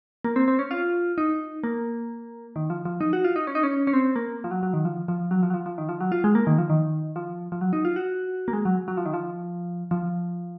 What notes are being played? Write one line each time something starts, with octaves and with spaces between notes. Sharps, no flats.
A#3
C4
C4
C#4
F4
D#4
A#3
D#3
F3
F3
D#4
F#4
F4
D#4
C#4
D#4
C#4
C#4
C4
A#3
F3
F#3
F#3
D#3
F3
F3
F#3
F3
F#3
F3
F3
D#3
F3
F#3
F4
G#3
A#3
D#3
F3
D#3
F3
F3
F#3
D#4
F4
F#4
A#3
G#3
F#3
F#3
F3
D#3
F3
F3